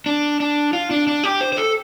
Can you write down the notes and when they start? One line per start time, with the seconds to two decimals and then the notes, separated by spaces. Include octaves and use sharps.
0.06 D4
0.40 D4
0.73 F4
0.91 D4
1.07 D4
1.24 G4
1.41 C5
1.53 C5
1.57 A4